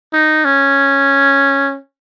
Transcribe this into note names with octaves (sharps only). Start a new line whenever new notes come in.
D#4
C#4